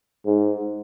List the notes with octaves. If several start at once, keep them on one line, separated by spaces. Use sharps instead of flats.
G#2